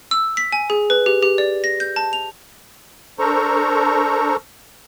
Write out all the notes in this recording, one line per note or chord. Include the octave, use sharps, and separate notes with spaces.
E6
B6
G#5
G#4
B4
G4
G4
D5
A#6
G6
A5
F7
D4 A4 A#4 C5 A#5 C#6